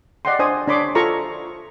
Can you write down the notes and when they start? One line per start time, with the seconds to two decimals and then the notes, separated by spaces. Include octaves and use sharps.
0.25 D5 D#5 F#5 G5 C6
0.39 D4 C5 G#5 D#6
0.68 D4 C#5 B5 C6 D6 D#6
0.95 F4 A4 C5 A#5 C#6